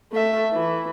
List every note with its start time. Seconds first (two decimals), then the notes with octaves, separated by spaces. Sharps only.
0.12 A3 E5
0.53 E3